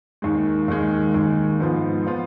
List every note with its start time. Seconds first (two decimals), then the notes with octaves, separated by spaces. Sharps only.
0.22 D#2 D#3 G#3
0.68 D#2 D#3 G#3
1.14 D#2 D#3 G#3
1.60 G#2 F3 B3 F4
2.07 F3 B3 F4